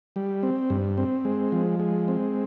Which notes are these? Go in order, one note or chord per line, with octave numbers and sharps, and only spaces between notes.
G3
C4
G2
C4
G#3
F3
G#3
C4